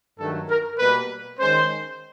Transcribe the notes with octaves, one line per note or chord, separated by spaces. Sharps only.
G2 D#3 F#3 A3 A4
A#4
B2 G3 A#3 B4
D#3 G#3 C#4 C5